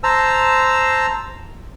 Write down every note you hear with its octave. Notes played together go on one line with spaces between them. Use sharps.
C5 A5 A#5 E6